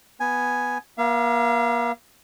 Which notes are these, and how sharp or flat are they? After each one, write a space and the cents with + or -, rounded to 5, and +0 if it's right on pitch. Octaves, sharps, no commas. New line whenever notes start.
B3 +0 G#5 +0
A#3 +35 F5 -35